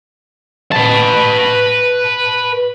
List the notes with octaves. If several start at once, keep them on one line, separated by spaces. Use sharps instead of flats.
B4 A5